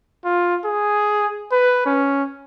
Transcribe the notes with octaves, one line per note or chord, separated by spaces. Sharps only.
F4
G#4
B4
C#4